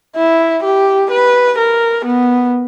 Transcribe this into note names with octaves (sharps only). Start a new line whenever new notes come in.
E4
G4
B4
A#4
B3